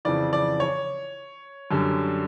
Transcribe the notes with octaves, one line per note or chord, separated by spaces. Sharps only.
F2 C#3 E3 D5
D5
C#5
F#2 D3 G3